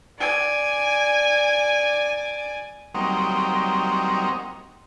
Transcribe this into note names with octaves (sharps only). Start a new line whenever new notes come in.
D5 G#5
F#3 G3 A#3 C4 D#4